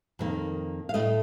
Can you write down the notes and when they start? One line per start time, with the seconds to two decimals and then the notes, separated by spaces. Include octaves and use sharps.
0.19 F2 D#3 A#3
0.89 F5
0.94 A2 A3 D#5